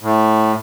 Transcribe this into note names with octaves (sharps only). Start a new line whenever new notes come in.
A2